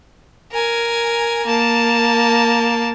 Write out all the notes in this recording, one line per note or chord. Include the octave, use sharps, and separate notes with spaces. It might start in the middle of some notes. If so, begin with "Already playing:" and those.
A#4 G#5
A#3 A5